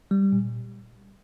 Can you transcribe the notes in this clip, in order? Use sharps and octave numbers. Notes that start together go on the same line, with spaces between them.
G3
A#2